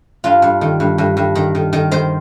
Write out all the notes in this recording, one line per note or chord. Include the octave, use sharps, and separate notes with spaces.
G2 F4
G2
D#3
G2
G2
G2
D#3
D#3
D#3
D#3 C5